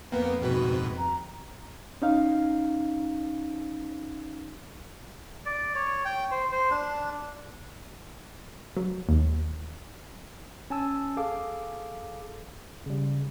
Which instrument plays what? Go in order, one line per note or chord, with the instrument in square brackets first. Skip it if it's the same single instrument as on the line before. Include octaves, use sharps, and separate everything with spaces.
[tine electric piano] F2 G5 [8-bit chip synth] A#3 B3 [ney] B4
[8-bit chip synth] G#2 B2 B4 [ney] F#4
[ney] A#5
[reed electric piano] C#4 D#4 F5
[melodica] D5
C#5
G5
C5
C5
D4
[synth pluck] F#3
D#2
[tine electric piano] C#4 G#5 A5 E6
G#4 A4 F5 D6
C#3 G3